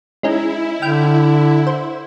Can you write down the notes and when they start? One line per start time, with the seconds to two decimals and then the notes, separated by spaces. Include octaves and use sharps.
0.23 G#3 C#4 D#4 E4
0.82 D3 G5 F6 D7
1.67 C5